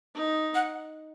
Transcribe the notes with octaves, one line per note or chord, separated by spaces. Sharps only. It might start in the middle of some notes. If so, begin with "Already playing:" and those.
D#4
F#5